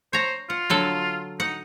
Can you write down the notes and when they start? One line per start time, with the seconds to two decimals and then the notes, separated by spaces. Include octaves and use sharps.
0.13 C5 C#5 A#5
0.50 F4 F#5
0.70 D3 F#3 A4
1.40 D#4 F#5